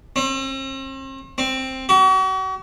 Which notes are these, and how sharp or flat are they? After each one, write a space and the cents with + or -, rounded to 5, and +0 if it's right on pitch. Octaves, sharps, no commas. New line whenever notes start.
C4 +45
C4 +10
F#4 +40